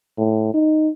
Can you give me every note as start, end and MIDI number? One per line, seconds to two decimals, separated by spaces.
0.18 0.51 45
0.54 0.90 63